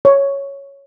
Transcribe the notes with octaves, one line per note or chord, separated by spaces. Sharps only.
C#5